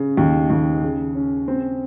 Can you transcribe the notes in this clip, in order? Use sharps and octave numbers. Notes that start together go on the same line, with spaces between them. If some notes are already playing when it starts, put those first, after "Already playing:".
Already playing: C#3
D#2
D#2
C#3
C#4
C4